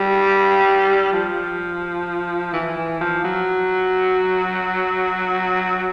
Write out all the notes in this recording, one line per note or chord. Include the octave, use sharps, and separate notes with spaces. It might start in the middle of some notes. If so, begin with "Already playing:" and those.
Already playing: G3
F3
E3
E3
F3
F#3